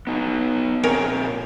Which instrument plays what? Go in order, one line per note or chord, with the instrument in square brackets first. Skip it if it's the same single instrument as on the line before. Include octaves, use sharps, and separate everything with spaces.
[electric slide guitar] B3 D#4
[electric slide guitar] A#2 C4 [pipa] G#4 A#4 C#5